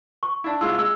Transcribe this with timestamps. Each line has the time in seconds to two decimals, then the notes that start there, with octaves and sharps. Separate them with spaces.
0.23 C#6
0.44 D4 E4
0.61 C2 G#3 F4 E6
0.78 G#3 E6